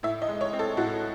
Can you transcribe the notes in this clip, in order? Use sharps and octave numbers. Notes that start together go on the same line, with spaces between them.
A2 E5
D#5
G#3
C#5
C4
A4
A2 F#4